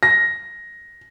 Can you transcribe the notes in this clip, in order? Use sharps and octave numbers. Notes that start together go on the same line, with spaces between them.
A#6